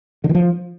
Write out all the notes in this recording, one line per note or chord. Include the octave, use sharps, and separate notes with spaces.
D3
D#3
F3